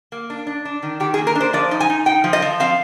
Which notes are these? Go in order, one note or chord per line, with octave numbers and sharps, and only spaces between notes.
A#3
D4
D4
D4
D#3
D#3 G4
G#4
A#3
A#4
D4
C5
F3 D5
D#4
G#5
D#4
D#4 G5
F3
D#5
F3
C4 F5